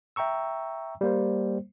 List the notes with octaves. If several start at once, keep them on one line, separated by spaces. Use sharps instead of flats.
E5 G5 A#5 C#6 E6
G3 A#3 C5